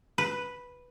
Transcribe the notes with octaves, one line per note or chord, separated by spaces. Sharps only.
B4